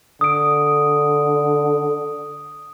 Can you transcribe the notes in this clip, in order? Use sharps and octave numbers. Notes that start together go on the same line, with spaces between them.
D3 D#6 D7